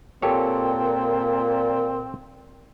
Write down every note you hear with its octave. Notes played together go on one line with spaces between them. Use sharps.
A#2 C4 G4 A4 C#5